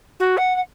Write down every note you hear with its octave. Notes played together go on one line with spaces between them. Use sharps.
F#4
F#5
F#5